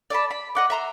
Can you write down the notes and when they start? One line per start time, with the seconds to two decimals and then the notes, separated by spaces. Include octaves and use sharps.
0.10 D5 E5 A5 B5
0.31 B5
0.55 D#5 F#5 D6
0.70 E5 A#5 C6